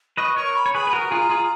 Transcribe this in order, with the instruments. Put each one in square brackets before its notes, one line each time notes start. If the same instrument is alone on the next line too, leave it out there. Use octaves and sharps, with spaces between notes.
[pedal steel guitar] B4 D#5 [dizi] C#6
[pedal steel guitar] A#4 C#5 [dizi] C#6
[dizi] B5
[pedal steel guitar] C#5
[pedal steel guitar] G#4 B4 [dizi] B5
[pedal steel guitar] B4
[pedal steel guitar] F#4 A#4 [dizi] A#5
[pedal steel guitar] F4 G#4
F4 G#4